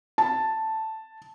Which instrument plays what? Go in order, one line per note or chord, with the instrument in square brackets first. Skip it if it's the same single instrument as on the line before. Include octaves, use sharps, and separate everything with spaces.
[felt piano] A5